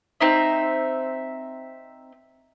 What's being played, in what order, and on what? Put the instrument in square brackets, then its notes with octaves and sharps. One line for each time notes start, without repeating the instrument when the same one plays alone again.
[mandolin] C4 D#4 E5